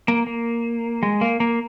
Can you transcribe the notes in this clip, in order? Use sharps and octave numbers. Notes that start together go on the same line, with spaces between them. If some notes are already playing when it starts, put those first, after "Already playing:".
A#3
A#3
G#3
A#3
A#3